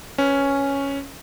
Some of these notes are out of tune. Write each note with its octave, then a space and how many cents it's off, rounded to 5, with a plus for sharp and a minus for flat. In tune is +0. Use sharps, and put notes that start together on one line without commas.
C#4 +0 B4 +0